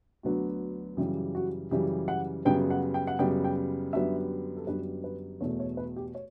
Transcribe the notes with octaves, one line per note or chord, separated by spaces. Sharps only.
D2 D3 F#3 B3 F#4
F#2 C#3 E3 G3 G4
F#4
F#2 C#3 E3 G3 G4
F#5
F#2 C#3 G3 B3 G5
F#5
G5
F#5
F#2 C#3 G3 B3 G5
G5
F#2 D3 G3 B3 E5
A4
F#2 D3 G3 B3 B4
B4
E2 B2 A3 C#5
C#5
B4
G4
C#5